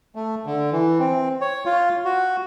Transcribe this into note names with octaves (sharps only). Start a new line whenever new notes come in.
A3
D3
E3
C4
C#5
F4
F#4